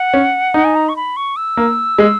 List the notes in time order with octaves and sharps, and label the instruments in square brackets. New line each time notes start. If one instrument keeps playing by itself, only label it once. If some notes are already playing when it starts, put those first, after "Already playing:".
Already playing: [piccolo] F#5
[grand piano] C#4
D#4
[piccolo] G#5
A#5
C#6
B5
C#6
E6
[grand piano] A#3
G#3